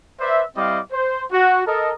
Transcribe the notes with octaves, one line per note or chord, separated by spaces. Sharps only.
B4 C5 D5 E5
G3 C4 E4 D#5 F5 D6
C5
F#4
A4 A#4 D#5